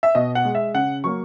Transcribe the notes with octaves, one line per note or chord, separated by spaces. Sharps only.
E5
B2 D#5
F#5
G#3
E5
C#3 F#5
F#3 A#3 C#6